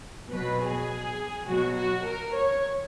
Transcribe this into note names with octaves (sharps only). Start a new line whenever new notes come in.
B2 F#3 B4
G#4
B2 F#3 F#4
F#4
A#4
C#5